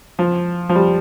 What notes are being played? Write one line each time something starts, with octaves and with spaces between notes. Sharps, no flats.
F3
F3
G3